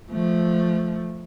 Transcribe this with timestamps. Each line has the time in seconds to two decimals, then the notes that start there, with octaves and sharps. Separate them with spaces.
0.10 F3 A3